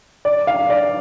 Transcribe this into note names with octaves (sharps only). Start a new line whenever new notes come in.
D5
F5
D5